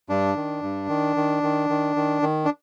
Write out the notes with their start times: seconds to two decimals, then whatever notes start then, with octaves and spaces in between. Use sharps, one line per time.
0.09 G2 D4
0.36 D#3
0.63 G2
0.89 D#3
1.16 D#3
1.43 D#3
1.70 D#3
1.96 D#3
2.22 D#3
2.45 D4